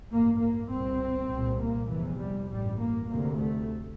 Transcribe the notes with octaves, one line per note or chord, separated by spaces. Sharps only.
A1 G2 A#3
A#3
C2 A#2 C4
C2 A#2
A#3
F1 E2 C3 E3
G3
A1 G2 G3
A#3
D2 C3 A#3
A3